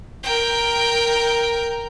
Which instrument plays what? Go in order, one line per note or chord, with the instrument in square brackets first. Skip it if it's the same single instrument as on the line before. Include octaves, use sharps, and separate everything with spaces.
[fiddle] A#4 G5